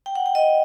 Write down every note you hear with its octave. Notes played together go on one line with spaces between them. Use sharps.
G5
F#5
G5
D#5